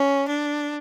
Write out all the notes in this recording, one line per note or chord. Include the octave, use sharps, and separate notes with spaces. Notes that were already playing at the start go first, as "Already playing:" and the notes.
Already playing: C#4
D4